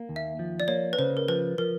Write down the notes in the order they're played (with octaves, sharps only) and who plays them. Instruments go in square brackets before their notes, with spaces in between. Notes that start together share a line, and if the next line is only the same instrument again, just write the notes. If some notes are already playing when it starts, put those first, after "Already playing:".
Already playing: [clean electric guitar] A#3
D#2
[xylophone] E5
[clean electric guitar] F3
[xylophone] D5
[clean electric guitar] A#3 [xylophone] C#5
[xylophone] B4
[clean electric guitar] C#3 [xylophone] C5
[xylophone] A#4
[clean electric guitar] F3 [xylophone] B4
[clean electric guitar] F3 [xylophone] A#4